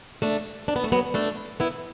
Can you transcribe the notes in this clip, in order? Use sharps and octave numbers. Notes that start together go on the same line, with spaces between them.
A3 D4
D4
B3
A3
F#3 B3
A3 D4
B3 E4